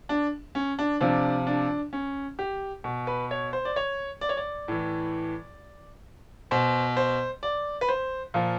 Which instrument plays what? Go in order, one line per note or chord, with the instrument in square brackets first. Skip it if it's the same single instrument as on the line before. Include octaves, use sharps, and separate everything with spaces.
[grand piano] D4
C#4
D4
C3 F3 D4
D4
C#4
G4
B2
B4
C#5
C5
D5
C#5
D5
C#5
D5
A2 E3
B2 C5
C5
D5
B4
C5
A#2 F3